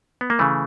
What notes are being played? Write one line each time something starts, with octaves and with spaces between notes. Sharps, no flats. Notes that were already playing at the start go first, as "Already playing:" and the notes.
B3
A#3
C#3 E3 A3